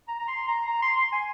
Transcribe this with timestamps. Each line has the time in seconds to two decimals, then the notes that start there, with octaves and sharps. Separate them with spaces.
0.08 A#5
0.19 A#5
0.28 C6
0.48 A#5
0.67 A#5
0.82 C6
0.97 C6
1.12 G#5